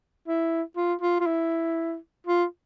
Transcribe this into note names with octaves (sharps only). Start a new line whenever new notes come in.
E4
F4
F4
F4
E4
F4